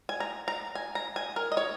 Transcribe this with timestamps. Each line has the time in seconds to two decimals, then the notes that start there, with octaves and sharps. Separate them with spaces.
0.09 G#5
0.20 A#5
0.48 A#5
0.75 G#5
0.95 A#5
1.16 G#5
1.36 A#4
1.52 D#5
1.57 C#5